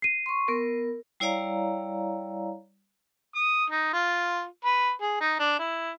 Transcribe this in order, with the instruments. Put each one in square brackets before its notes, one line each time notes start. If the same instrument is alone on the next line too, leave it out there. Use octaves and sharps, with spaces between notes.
[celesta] C7 D#7
[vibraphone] C6 C#6
B3 A#4
G3 E4 C#5 D5 F5 A#5
[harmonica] D#6
D#4
F4
B4
G#4
D#4
D4
E4